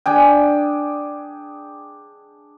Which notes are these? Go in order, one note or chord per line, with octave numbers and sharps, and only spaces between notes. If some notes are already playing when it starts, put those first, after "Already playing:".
D4 G#4 G5